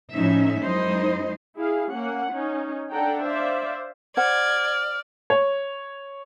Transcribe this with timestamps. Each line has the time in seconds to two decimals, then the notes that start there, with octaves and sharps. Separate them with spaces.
0.12 F2 A2 F3 C#4 D#4 E5
0.61 F#2 G#3 D#4 E4 C5 D#5
1.57 E4 G#4 F5
1.91 A#3 C#4 F#5
2.32 C#4 D#4
2.92 D4 A4 F#5 G5 A#5
3.22 C5 D5 E5 F5
4.17 C5 D5 F#5 F6 G#6
5.30 C#5